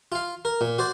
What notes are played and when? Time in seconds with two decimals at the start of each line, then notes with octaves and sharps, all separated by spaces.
0.12 F4 F5
0.45 A#4
0.61 A#2
0.78 F#4 C5 D5